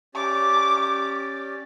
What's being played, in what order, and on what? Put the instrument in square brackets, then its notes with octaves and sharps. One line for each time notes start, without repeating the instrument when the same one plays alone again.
[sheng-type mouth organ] C#4 G4 D5 [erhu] D6